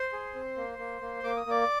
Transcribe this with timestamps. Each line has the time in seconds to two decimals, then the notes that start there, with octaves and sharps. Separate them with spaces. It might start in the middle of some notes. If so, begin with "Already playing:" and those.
Already playing: C5 C6
0.13 G#4
0.34 C4
0.56 A#3
0.79 A#3
1.01 A#3
1.23 A#3 D6
1.37 D#6
1.46 A#3 D5 D6